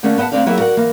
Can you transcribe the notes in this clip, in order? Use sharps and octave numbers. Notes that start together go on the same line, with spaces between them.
D3 A3 A#3 C#4 D4
B3 D#5 E5 F#5 A5
D2 C3 C4 D4 D5 F5
F#3 A#3 B3 E4 G#4 E5
F#4 A#4 D5 E5 F#5
E3 A#3